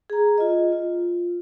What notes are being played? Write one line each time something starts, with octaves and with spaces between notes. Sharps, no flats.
G#4 A#5
F4 D#5
F4